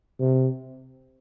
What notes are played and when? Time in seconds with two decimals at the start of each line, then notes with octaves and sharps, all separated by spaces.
0.20 C3